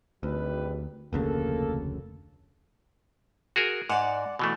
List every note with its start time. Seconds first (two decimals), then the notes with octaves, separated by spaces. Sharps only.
0.23 G#1 D2 G3 B4
1.13 F1 D2 C#3 A#3 A4
3.56 F#4 G#4 A#4
3.90 G#2 D5 F#5
4.39 B2 E3 A3